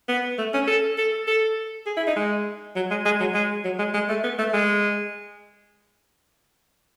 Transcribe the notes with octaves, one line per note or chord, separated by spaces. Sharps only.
B3
A3
C#4
A4
A4
A4
G#4
E4
D#4
G#3
F#3
G#3
G#3
F#3
G#3
F#3
G#3
G#3
A3
B3
A3
G#3